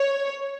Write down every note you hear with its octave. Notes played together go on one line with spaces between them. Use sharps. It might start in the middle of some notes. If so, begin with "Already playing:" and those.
Already playing: C#5